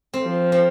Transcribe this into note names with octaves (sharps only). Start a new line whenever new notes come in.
C4
F3
C4